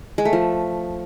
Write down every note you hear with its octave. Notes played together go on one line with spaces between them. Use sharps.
G#3
A3
F3